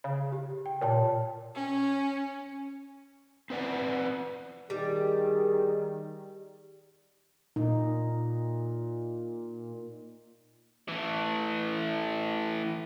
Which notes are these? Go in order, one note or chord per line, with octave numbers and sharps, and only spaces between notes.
C#3
G4
G5
A#2 C#5 G5 A5
C#4
C4 B4 D5 F#5
D#3 G3 G#4
A#2 D#4
E3 A3